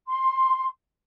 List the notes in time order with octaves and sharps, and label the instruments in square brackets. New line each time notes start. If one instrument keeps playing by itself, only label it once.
[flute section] C6